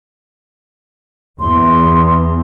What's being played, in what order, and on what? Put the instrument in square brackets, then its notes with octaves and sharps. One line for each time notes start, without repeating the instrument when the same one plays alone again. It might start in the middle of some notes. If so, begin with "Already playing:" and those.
[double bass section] E2 [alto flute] C6